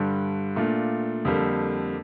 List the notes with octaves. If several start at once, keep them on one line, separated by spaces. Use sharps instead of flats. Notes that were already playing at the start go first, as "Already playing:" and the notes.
Already playing: G2 D3 G3
A#2 A3 D4 F4
F2 D3 G3 A#3